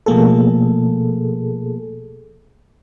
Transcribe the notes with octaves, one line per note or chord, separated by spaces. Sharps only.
B2 F3 A3 A#3 G#4 A4